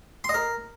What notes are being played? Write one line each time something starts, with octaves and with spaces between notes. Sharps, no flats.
C6
D#5
A#4